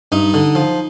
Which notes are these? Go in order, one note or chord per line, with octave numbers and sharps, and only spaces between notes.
G2 D#4
D3
F3